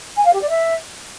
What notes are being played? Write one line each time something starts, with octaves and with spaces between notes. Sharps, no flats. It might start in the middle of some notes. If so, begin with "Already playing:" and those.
G#5
F5
G4
D5
E5